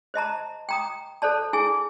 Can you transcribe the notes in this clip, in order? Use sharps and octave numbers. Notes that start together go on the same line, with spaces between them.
C5 D#5 A5 A#5
G5 A#5 D#6
A4 C5 D5 A5
E4 G#4 G#5